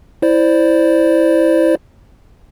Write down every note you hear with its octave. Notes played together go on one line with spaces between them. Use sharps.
E4 C5 D5